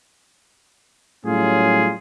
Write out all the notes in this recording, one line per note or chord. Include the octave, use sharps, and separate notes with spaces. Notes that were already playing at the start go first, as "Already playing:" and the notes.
A2 F#3 G3 C#4 F4 G#4